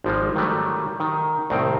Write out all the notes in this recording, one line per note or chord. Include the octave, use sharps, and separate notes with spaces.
G#1 F3 G3 G#3
D#3 F#3 G3 A3
D#3
C2 A2 D#3 C4 G5